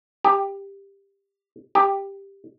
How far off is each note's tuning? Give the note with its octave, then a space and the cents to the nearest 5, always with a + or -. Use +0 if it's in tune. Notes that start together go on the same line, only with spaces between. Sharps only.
G4 +15
G4 +10